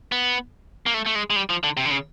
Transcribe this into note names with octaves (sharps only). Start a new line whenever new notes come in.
B3
A#3
A3
A3
G#3
G#3
G3
F3
D3
C3
D3
C#3